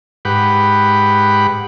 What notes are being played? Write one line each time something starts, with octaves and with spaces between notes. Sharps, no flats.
G#2 G4 B4 F#5